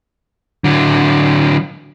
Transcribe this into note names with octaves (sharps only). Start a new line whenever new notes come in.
D3 F#3